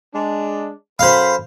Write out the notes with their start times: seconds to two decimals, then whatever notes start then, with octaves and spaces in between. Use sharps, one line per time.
0.14 G#3 D4
0.99 F#2 A4 C5 F5 B5